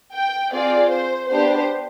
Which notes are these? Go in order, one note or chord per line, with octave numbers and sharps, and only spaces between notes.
G5
C4 F4 G#4 D5
C5
B3 D4 G4 C5